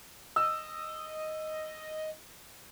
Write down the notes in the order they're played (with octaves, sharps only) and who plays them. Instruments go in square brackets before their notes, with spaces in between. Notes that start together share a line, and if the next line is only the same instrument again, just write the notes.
[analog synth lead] D#5 [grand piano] E6